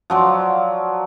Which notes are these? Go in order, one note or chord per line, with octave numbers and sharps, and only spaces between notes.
F3 F#3 D5